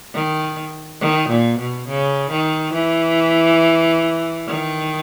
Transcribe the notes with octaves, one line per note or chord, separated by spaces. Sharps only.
D#3
D#3
A#2
B2
C#3
D#3
E3
D#3